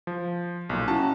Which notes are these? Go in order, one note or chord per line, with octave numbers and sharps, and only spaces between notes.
F3
B1 A#2
C#4 E4 F#4 A5